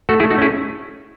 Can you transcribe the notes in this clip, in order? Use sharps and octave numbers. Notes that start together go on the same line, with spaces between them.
A3 F#4 A4
E4 G#4
A3
D#4 F#4
C#4 E4 G#4